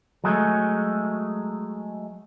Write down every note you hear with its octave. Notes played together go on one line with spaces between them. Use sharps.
F#3 G#3 A3